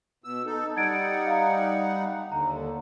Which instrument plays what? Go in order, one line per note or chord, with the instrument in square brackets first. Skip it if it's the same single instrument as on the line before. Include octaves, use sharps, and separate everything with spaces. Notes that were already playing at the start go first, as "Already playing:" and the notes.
[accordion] B2 E6
D#4 A4
[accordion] G3 D#4 F#5 [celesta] G#6 A6 D7
[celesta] F5 A#5
[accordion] D#2 D3 [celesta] A#5